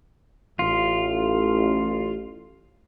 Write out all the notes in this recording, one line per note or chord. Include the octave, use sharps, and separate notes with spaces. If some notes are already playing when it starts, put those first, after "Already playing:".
A1 F4